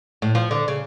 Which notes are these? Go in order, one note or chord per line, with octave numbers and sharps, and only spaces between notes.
A2
F3
D3
C#3